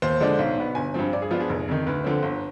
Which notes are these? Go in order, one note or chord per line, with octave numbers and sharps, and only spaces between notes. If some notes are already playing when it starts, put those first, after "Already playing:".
D#2 C5
D3 F3 G#3 D4
B1
B2 B3
G1 G#5
G2 F3 C4
G2 D5
G#4
F3 B3 D4 F4
G#4
F1
F2 D#3
D2 B4
D3 F3 C4
G1